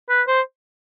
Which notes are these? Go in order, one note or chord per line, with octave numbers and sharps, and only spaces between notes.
B4
C5